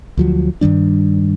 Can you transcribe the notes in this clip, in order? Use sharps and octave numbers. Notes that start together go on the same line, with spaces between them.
D2 F3 F#3
G2 D#3 G3 D4